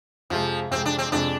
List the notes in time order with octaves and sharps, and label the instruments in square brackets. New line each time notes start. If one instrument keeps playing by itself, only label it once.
[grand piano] F2 C3 G#3 [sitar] F3
[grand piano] F2 C3 G#3 [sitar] C4
[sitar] D4
C4
[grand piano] F2 C3 G#3 [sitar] D4